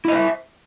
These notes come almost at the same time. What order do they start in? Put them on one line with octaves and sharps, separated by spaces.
E4 D#5 C5 E5